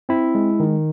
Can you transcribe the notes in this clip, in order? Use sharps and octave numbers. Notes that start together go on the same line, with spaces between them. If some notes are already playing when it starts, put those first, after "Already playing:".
C4 E4
G#3
D#3